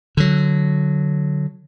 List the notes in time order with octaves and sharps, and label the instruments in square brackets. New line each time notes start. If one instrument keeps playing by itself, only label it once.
[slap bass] D3 F#3